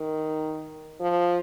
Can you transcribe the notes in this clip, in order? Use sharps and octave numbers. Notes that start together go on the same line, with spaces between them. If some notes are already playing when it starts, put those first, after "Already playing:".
Already playing: D#3
F3